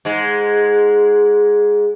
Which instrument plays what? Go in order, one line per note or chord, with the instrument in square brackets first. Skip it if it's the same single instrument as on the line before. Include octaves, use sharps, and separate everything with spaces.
[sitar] G#2 G#3